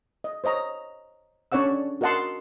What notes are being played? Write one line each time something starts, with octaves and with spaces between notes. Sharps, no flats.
D#5
C5 C#5 D#5 A#5
C#4 D4 C#5 D5 F#5 E6
F#4 A#4 D#5 F#5 A5 C6